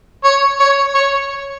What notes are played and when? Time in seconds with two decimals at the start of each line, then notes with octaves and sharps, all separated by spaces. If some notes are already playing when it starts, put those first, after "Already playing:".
0.24 C#5
0.60 C#5
0.95 C#5